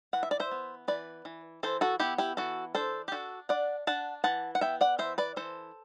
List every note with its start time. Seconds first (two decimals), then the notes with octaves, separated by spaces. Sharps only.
0.13 E3 F#5
0.23 E5
0.31 D5
0.40 C5 E5
0.51 B3
0.88 E3 B4 D5
1.25 E3
1.63 E3 A4 C5
1.81 F#4 A4
2.00 B3 E4 G4
2.18 E4 G4
2.37 E3 F#4 A4
2.75 D4 A4 C5
3.08 G4
3.12 D4 F#4 A4
3.49 D4 D5 F#5
3.87 D4 F#5 A5
4.24 E3 F#5 A5
4.55 F#5
4.61 B3 E5 G5
4.81 D5 F#5
4.98 E3 C5 E5
5.18 B4 D5
5.36 E3 A4 C5